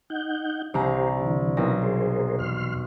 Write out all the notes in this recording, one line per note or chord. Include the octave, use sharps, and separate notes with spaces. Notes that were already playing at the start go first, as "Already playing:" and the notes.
D#4 F#5 G6
C2 G4 C5 A#5
D3 E3
B1 E4 A#4 A#5
G#4 A#4 C5
E2 C6 F6